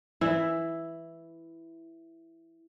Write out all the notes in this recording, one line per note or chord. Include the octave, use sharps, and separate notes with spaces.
E3 E4